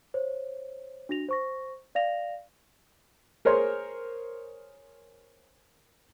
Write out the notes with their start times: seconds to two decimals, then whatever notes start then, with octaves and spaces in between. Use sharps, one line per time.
0.14 C5 C#5
1.09 D4 F#4 A#6 F7
1.29 C5 C#6 A#6
1.95 D5 F5 A#6 F7
3.45 G#4 A#4 C5 C#5 C6